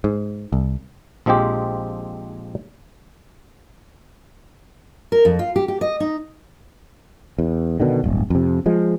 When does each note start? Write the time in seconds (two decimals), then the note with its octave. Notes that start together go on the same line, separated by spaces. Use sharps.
0.04 G#2
0.52 C2
1.26 A#1 F3 G#3 C4 G4
5.12 A#4
5.25 F2
5.39 F4
5.56 G4
5.68 G4
5.81 D#5
6.00 D#4
7.39 E2
7.80 B2 D3 D#3
8.04 D1 G1
8.30 F2 C3
8.66 F3 G#3